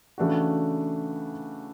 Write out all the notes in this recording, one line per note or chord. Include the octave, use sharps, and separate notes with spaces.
C#3 E3 A3 D4 F#4